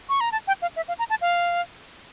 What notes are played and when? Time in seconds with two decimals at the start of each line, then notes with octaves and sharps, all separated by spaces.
0.09 C#6
0.21 A#5
0.32 A5
0.47 G5
0.62 F5
0.76 E5
0.88 F5
0.99 A#5
1.10 A5
1.21 F5